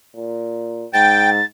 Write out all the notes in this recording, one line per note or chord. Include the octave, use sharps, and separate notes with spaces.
A#2
G#2 G5 A6